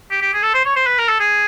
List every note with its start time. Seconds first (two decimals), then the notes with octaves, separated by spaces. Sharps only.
0.11 G4
0.22 G4
0.33 G#4
0.43 A4
0.54 C5
0.65 C#5
0.76 C5
0.86 B4
0.98 A#4
1.09 A4
1.20 G#4